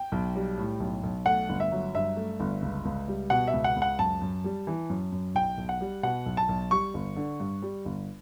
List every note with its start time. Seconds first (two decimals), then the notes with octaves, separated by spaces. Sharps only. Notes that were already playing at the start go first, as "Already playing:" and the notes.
Already playing: G5
0.12 B1
0.36 G3
0.58 A2
0.80 B1
1.03 B1
1.26 A3 F#5
1.49 G1
1.60 E5
1.72 F#3
1.95 G2 E5
2.17 A3
2.40 G1
2.62 C#2
2.85 C#2
3.08 G3
3.30 B2 F#5
3.48 E5
3.53 C#2
3.64 F#5
3.76 C#2
3.82 F#5
3.99 F#2 A5
4.21 F#2
4.44 G3
4.67 E3
4.90 F#2
5.12 F#2
5.35 B1 G5
5.57 B1
5.69 F#5
5.81 G3
6.03 B2 F#5
6.26 B1
6.37 A5
6.49 B1
6.71 G3 C#6
6.94 G1
7.16 D3
7.40 G2
7.62 G3
7.85 G1